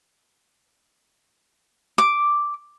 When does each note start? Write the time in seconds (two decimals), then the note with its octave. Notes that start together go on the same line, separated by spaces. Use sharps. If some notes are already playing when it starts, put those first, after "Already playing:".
1.98 D6